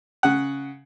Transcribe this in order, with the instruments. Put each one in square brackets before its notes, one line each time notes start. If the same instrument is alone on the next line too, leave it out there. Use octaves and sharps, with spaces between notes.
[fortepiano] C#3 F#5